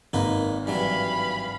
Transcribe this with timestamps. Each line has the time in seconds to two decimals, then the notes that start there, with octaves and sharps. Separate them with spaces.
0.13 G#1 A#3 D#4 B4
0.67 G2 E3 F#3 F5 B5